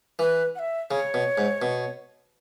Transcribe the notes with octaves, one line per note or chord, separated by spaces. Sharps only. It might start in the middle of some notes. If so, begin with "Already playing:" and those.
E3 B4
F#5
E5
C#3 C#5
B2
G#2
B2